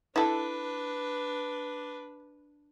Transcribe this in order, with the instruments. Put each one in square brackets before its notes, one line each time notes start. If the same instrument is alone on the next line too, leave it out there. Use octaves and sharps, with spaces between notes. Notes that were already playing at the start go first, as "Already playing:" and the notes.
[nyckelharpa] D4 B4 [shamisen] E4 A4